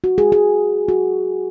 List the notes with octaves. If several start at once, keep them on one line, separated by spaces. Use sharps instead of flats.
F#4
G#4
G#4
F#4